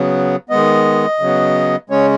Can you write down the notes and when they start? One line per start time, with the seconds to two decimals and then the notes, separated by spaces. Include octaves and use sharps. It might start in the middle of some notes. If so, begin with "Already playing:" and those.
Already playing: C#3 F#3 B3
0.50 D#3 G#3 B3 D#5
1.20 C#3 F#3 B3
1.90 C#3 G#3 C#4 C#5